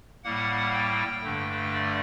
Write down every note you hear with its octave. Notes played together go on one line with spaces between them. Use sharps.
A2 G3 A#3 F#5
G5
G2 D3 A3
D5